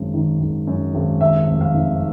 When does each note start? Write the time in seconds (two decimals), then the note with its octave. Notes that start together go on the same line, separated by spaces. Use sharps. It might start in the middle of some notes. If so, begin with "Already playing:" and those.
Already playing: G#1 F#2
0.14 D#3
0.41 G#1
0.67 F#2
0.94 G#1
1.21 D#2 E5
1.47 F1
1.61 F5
1.74 D#3